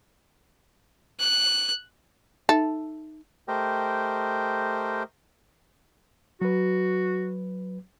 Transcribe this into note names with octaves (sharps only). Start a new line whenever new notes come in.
F#6
D#4 A4 E5
A3 G4 A#4 C5 D#5 G5
F#3 F#4 B4